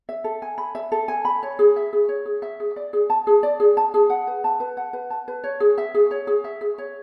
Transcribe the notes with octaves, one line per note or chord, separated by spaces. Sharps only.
E5
A4
G#5
B5
E5
A4
G#5
B5
C#5
G#4
E5
G#4
C#5
G#4
E5
G#4
D5
G#4
A5
G#4
D5
G#4
A5
G#4
F#5
B4
A5
B4
F#5
B4
A5
B4
C#5
G#4
E5
G#4
C#5
G#4
E5
G#4
C#5